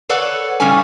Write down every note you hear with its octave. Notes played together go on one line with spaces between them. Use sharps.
A4 B4 C#5 D5 F#5
A2 C#3 G3 A3 C#4 G#5